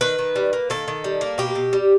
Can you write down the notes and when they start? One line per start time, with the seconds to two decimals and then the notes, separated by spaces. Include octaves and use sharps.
0.01 D#3 B4
0.19 D#3
0.36 G3
0.53 A#3
0.70 D#3 A4
0.88 D#3
1.04 G3
1.21 A#3
1.38 B2 G4
1.55 B2
1.73 G3